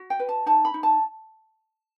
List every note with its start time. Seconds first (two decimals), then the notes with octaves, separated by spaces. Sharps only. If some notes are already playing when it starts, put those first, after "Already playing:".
Already playing: F#4
0.10 G5
0.19 B4
0.29 A5
0.46 D#4 A5
0.65 B5
0.74 D#4
0.83 A5